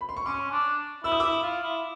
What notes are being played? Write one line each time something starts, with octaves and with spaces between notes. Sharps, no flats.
B5
C6
C#6
C#4 C6 D6
D4
E4 E6
D#6
E4 D6 E6
F4
E4